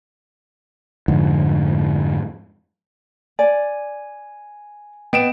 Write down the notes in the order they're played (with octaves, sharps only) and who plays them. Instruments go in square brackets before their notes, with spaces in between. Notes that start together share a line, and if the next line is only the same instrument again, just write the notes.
[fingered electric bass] F2 G#2 D3
[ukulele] D5 [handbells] G#5
[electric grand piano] B3 D7 E7 [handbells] D#5 G5